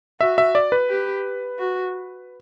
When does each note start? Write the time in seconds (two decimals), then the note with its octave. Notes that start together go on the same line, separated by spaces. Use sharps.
0.20 F#4 E5
0.38 E5
0.55 D5
0.72 B4
0.90 G4
1.59 F#4